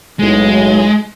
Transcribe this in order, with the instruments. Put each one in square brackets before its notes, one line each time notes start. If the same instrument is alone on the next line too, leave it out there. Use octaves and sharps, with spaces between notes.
[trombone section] B1 A2 [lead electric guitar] G#3